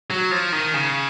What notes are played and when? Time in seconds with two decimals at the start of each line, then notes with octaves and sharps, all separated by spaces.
0.10 F#3
0.31 F3
0.52 D#3
0.74 C#3